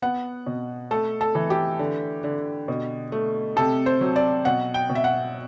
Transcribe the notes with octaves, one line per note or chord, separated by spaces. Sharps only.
B3 F#5
B2
A3 A4
A4
E3
G4
D3
D3
B2
A3
C3 A4
C5
F#3
D5
B2 F#5
G5
B2
E5
F#5